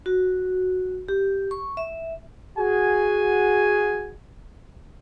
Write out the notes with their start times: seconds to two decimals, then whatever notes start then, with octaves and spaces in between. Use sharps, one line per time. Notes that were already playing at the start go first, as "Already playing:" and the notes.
0.06 F#4
1.08 G4
1.51 C#6
1.77 E5
2.57 F#4 G#4 G#5